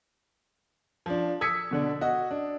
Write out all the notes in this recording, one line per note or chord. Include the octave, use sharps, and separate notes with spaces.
F3 D4
D#6 E6 G#6 B6 C#7
B2 D3 D4
F#4 D#5
D4